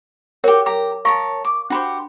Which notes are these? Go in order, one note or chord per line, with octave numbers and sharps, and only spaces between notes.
F#4 G4 A#4 C#5
G4 A#5 D6
A#4 C#5 F5 A5 C#6 D#6
D6
D4 F#4 G4 C5 B5